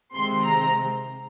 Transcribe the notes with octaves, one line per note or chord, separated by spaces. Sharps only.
C3 D#3 G#3 C4 C6
A#5